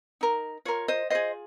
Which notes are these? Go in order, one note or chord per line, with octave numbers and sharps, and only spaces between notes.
D#4 A#4
F4 A#4 C#5
C5 D#5
F4 G#4 C5 D#5